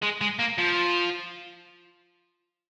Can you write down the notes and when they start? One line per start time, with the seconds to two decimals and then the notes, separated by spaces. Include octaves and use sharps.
0.03 G#3
0.21 G#3
0.39 A#3
0.58 F3